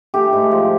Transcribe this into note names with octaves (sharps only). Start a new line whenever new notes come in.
A3 G4
G#2
F3